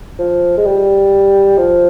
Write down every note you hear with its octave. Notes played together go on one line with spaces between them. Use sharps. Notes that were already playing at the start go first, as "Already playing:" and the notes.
F3
G#3
G3
F3